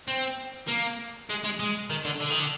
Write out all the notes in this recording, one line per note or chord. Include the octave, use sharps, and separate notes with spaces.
C4
A#3
G#3
G#3
G#3
D#3
D3
D3
D#3
D3